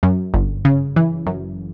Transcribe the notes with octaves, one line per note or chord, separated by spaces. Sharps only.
F#2
G1
C#3
E3
F#2